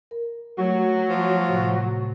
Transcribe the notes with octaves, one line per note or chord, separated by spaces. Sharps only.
A#4
F#3 A3 F#4
F3
A2 C3